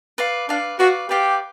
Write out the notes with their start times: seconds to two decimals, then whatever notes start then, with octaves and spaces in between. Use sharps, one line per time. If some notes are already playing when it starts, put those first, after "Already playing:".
0.18 B4 D5 F5
0.48 D4 B4 D5 F5
0.79 F#4 B4 D5 F5
1.08 G4 B4 D5 F5